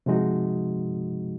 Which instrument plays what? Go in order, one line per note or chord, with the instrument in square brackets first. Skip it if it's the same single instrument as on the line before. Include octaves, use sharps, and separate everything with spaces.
[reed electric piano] C3 F3 G#3 D#4 F#4